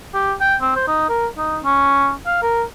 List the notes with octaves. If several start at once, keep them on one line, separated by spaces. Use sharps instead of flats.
G4
G5
C4
C5
D#4
A#4
D#4
C#4
F5
A#4